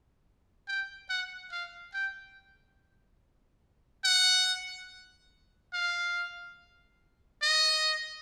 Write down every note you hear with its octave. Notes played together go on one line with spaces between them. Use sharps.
G5
F#5
F5
G5
F#5
F5
D#5